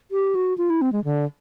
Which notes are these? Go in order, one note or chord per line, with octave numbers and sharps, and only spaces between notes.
G4
F#4
F4
E4
C4
G#3
D3